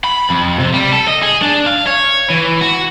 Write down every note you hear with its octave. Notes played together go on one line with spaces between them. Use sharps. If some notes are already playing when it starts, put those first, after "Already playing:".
B5
F2
C3
G3
A4
D#5
G#4
D4
F5
C#5
E3
F#4